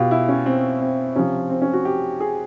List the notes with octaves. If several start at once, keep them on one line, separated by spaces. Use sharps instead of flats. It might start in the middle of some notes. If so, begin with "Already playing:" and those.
Already playing: B2 F4 G4
E4
C#4
C4
C4
C3 F3 C#4
C4
C#4
F#4
G4
G#4